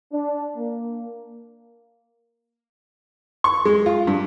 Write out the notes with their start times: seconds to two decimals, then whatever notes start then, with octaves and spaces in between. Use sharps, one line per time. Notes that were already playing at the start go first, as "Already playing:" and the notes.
0.12 D4
0.56 A#3
3.44 C#6
3.65 G#3
3.86 F4
4.07 G2